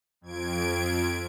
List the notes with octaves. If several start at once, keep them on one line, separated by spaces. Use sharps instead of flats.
F2 G#6 D7